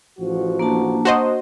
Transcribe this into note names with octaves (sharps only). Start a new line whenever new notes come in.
A1 F3 F#4
A#3 D4 A5
F#4 C5 D#5